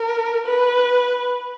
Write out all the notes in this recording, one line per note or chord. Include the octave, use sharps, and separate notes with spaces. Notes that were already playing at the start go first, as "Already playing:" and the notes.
Already playing: A#4
B4